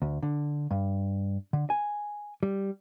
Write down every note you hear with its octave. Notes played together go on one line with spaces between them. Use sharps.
D2
D3
G2
D3
G#5
G3